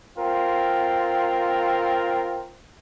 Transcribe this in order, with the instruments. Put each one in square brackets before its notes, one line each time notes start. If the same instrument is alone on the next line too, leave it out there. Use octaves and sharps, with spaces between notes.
[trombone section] C4 F4 A#4